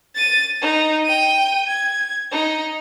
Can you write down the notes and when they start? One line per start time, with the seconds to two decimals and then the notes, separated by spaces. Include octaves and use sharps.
0.15 A6 D#7
0.62 D#4
1.05 G5 D#7
1.68 G#6
2.31 D#4